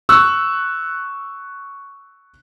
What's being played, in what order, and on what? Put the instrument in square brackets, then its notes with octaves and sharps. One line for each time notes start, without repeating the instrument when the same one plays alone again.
[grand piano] C#6 E6 F#6